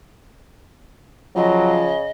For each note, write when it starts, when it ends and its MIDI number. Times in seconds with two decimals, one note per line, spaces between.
1.36 2.11 49
1.36 1.94 53
1.36 1.82 54
1.36 2.10 75